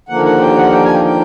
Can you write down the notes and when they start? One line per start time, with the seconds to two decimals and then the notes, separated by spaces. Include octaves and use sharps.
0.09 D#2 D3 F3 A#3 F#5
0.25 F#5
0.41 G5
0.57 F#5
0.73 G5
0.84 G#5
0.94 G5
1.05 G5